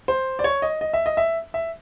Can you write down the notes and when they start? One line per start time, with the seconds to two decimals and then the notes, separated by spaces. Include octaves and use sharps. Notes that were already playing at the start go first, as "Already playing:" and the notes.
0.08 C5
0.39 D5
0.44 C#5
0.62 D#5
0.81 D#5
0.93 E5
1.06 D#5
1.17 E5
1.54 E5